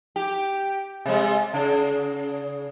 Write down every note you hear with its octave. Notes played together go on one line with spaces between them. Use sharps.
G4
C3 G#3
C#3